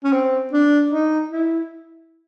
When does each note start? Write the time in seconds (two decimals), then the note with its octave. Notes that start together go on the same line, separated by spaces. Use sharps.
0.04 C#4
0.12 C4
0.53 D4
0.92 D#4
1.31 E4